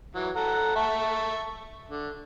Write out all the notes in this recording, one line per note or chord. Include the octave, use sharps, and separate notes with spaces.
E3 F#3
A4 F#5 A#5
E5 A5 C#6
D3